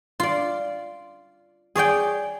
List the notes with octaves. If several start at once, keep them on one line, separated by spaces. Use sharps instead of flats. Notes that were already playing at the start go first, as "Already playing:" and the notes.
F4 D5
G#4 C#5 D5 G5